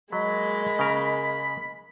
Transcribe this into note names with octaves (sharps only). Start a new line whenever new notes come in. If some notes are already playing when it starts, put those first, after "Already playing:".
F#3 G#3 A#3 D#5 B5
C#3 A#4